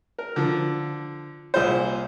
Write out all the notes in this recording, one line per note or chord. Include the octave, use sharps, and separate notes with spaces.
A#4
D3 F3
C2 A#2 G#4 C5